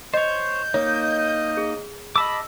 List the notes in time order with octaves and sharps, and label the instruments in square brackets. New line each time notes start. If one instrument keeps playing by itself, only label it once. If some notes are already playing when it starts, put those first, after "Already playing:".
[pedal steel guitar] C5 C#5 [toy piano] D#5 [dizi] G6
[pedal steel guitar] A#3 D#4 [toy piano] C#5 [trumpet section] D#5
[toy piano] G#4
[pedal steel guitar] D#5 A5 D6 [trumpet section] B5 [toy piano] E6